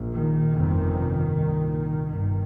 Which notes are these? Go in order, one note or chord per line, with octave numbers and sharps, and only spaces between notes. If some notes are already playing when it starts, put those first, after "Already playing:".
Already playing: A#1 A#2
D#3
G1 F2 C3
C2 A#2
G1 G2 D#3